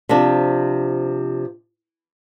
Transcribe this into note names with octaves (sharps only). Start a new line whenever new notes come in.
C3 F3 D4